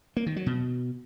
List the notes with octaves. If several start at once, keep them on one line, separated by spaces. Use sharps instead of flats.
A#3
D#3
F#3
B2